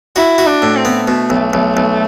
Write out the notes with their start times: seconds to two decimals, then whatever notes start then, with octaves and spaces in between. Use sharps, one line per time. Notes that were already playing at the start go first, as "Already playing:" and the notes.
0.16 E4 F#4
0.38 F#4
0.46 D4
0.62 A2
0.77 C4
0.85 B3
1.08 B2 A3
1.30 B1
1.53 B1
1.77 B1